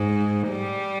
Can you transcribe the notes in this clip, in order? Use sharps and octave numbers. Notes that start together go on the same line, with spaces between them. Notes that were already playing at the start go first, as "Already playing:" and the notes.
Already playing: G#2
G3